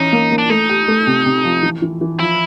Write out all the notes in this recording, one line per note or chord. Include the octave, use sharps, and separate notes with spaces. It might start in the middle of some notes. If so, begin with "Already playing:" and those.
Already playing: E3 C#4 D#4
A#3
A#3
D4
A3 D#4
G4
A3
C3
C3
F3
E3
E3
E3
F3 E4